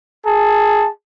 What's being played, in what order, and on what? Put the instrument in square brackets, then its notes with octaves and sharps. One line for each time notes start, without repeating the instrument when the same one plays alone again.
[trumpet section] G#4 A5